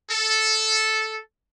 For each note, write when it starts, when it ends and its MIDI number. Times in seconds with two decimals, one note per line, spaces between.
0.11 1.18 69